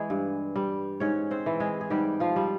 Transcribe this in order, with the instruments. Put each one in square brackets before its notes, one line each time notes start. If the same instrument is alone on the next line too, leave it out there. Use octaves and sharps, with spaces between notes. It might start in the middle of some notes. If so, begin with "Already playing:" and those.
Already playing: [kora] E3 G#3 G#4
G2
G3
G#2 C#4 C#5
C4 C5
E3
G#3 G#4
G#4
G#2 G3 G4
F3 F4
G3